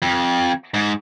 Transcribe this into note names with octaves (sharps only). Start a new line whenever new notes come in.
F2
G#2